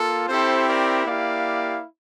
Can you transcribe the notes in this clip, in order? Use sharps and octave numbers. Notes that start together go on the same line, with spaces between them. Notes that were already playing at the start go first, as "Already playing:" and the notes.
Already playing: A#3 F4 A4
C4 E4 G4 A4 C5
A#4 D5
A#3 E4 G4 D5 F5